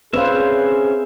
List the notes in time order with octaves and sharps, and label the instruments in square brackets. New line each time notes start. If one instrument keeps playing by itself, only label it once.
[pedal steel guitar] C4 C#4 E5 [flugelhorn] G#4 [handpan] B4 C5 F5